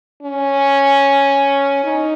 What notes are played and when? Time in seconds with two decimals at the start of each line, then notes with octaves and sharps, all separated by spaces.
0.22 C#4
1.84 D#4